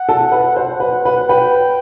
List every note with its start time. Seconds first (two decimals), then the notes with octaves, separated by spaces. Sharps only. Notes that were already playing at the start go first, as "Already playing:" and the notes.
Already playing: F#5
0.09 A4
0.32 B4
0.56 C5 F#5
0.80 B4
1.05 B4
1.29 B4 G5